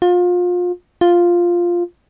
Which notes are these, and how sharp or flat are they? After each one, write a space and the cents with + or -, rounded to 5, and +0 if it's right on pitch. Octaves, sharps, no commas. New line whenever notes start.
F4 +30
F4 +0